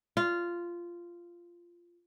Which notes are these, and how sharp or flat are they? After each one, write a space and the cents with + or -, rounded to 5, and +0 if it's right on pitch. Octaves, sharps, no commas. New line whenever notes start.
F4 -10